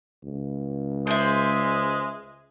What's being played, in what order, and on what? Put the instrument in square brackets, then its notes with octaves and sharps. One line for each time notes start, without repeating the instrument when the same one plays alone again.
[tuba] C#2
[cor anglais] G#3 [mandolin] C5 D5 E5